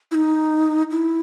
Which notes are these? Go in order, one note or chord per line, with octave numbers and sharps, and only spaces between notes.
E4
D#4
E4